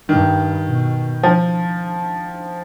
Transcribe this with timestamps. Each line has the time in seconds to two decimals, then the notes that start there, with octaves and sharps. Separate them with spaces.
0.09 G2 D#3
0.66 B2
1.23 F3